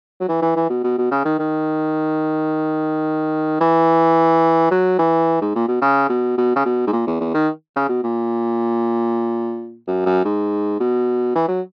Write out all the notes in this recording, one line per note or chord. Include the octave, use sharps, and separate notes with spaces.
F#3
E3
E3
E3
B2
B2
B2
C#3
D#3
D#3
E3
F#3
E3
G#2
A#2
B2
C#3
B2
B2
C#3
B2
G#2
A#2
E2
E2
D#3
C#3
B2
A#2
F#2
F#2
G#2
B2
E3
F#3